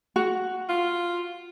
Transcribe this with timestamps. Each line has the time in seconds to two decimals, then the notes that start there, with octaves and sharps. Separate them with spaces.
0.16 F#4
0.69 F4